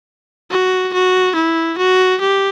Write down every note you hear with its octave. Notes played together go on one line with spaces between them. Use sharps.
F#4
F#4
E4
F#4
G4